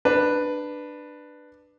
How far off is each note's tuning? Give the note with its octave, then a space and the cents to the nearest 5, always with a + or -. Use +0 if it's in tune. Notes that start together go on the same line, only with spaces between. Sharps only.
D4 +15 B4 +0